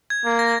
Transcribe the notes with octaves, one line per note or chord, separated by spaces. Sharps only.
G#6
A#3
A#6